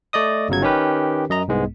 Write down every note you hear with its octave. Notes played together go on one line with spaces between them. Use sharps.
A3 D5 D#5 D#6
G1 C#3 F#3 G#6
D#3 C#4 G4 B4
F#2 D#5 A#5
C2 G#2 G#3 B3